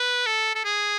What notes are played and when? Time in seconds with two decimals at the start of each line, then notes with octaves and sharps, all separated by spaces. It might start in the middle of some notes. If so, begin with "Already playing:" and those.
Already playing: B4
0.26 A4
0.55 A4
0.64 G#4